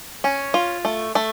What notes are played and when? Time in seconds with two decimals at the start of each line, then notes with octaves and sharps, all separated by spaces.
0.24 C#4
0.54 F4
0.85 A3
1.15 A3